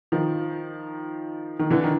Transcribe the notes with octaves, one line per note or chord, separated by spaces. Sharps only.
D#3 F3
D#3
D3 E3
D#3